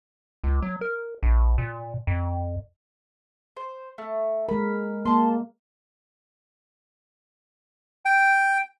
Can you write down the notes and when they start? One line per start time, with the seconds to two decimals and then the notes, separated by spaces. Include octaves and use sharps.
0.44 C#2
0.62 F#3
0.81 A#4
1.23 A#1
1.58 A#2
2.07 F2
3.57 C5
3.98 A3
4.49 G#3 A#4 B5
5.05 A#3 A5 C6
8.05 G5